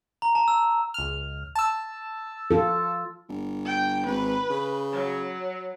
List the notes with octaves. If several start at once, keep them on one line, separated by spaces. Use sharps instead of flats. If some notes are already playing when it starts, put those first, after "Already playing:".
A#5
A5
E6
C#2 F6
A5 E6
F4 A4
G1
G5
G#1 B4
C#3
F#3